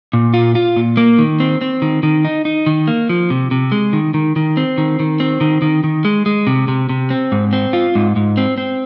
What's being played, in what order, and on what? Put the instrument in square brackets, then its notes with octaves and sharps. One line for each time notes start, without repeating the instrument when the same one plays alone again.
[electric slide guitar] A#2
F4
F4
A#2
A#3
D#3
C4
C4
D#3
D#3
D#4
D#4
D#3
A#3
F3
C3
C3
G#3
D#3
D#3
D#3
C4
D#3
D#3
C4
D#3
D#3
D#3
G#3
G#3
C3
C3
C3
C4
G#2
C4
F4
G#2
G#2
C4
C4